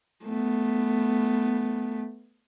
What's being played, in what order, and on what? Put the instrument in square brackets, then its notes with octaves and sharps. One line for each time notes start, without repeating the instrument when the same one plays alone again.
[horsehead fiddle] A3 B3